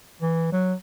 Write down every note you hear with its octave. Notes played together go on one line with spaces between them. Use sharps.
E3
F#3